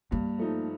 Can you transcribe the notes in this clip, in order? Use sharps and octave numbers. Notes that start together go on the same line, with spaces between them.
G2 A#3
F3 A3 D#4